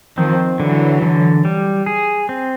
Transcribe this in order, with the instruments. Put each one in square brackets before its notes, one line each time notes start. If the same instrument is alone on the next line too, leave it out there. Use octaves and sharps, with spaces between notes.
[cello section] D#3 F3 [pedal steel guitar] C4
[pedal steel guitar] D3 [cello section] E3 F#3
[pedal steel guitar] D3
G3
G#4
C4